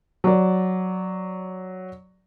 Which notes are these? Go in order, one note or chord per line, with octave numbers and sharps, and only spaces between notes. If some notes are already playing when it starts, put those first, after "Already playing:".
F#3 D5